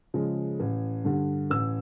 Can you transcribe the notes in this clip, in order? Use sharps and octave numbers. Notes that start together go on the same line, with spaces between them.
C#3 F3 G#3
A1
G2 D3
A1 E6